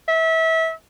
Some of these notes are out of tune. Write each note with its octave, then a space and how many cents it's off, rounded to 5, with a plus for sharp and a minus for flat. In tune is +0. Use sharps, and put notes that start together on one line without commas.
E5 -25